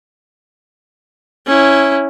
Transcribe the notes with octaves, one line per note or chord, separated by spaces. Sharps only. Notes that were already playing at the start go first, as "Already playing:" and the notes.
C#4 E4